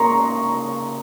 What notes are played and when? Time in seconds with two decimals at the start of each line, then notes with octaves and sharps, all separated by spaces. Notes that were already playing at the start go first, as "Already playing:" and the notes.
Already playing: C#3 A#3 A#5 C6 C#6